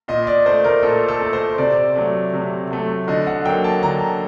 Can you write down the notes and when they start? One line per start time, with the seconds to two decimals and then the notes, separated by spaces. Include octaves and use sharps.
0.08 A#2 D#5
0.27 D5
0.46 A3 C5
0.65 A#4
0.83 A#2 A4
1.08 A4
1.21 A3
1.33 C5
1.58 C3 D5
1.96 F#3 A3
2.33 C3
2.70 F#3 A3
3.08 D3 D#5
3.27 F#5
3.45 F#3 A#3 G5
3.64 A5
3.83 D3 A#5